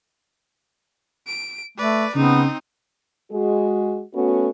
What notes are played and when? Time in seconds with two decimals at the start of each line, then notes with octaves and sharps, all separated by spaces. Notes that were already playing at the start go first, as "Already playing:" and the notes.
1.27 D7
1.78 A3 B4 D5
2.15 C#3 B3 C4 D#4
3.32 G#3 F#4 G#4
4.15 A3 B3 C#4 F#4